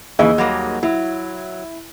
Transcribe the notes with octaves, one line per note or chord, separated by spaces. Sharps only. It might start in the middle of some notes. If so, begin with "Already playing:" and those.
D#2 C#3 E3 G#4 D#5
F#3 G3 A#3
F#3 E4